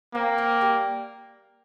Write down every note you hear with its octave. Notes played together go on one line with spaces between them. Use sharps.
A#3 C4
C4
G3